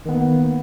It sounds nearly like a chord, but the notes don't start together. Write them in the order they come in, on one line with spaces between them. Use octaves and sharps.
D#3 B3 A#3